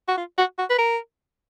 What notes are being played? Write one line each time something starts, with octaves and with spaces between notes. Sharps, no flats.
F#4
F4
F#4
F#4
B4
A#4